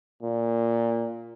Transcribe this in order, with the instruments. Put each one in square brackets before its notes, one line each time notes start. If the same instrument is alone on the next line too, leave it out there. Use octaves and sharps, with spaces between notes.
[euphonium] A#2